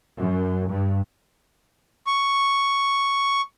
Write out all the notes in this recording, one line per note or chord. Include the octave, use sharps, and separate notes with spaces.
F#2
G2
C#6